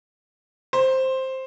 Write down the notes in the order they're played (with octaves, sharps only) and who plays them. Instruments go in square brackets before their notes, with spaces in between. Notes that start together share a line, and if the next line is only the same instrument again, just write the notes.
[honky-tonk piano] C5